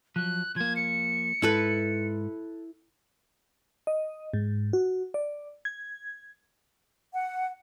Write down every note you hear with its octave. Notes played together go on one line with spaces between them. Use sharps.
F3 F#3 F#6
F3 A#3 G#6
C#7
G#2 E4 A4 B4
D#5
G#2
F#4
D5
G#6
F#5